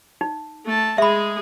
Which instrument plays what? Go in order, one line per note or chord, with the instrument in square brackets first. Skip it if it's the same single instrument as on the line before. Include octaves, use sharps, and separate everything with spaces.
[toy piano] D#4
[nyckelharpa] A3 A5
[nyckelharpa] G#3 G#4 [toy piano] E5 B5